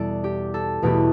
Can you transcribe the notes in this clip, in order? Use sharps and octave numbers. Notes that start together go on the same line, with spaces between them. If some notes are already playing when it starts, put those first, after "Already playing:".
Already playing: E2 B2 G3 A4 D5
G4
A4
E2 B2 A3 G4 B4